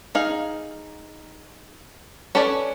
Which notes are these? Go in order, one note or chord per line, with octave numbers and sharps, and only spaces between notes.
D#4 G#4 F5
C#4 A4 B4 C#5 D5